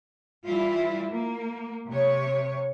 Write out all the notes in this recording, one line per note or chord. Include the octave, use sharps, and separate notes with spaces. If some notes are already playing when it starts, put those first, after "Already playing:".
E3 G3 E4 F4
A#3
C3 C#5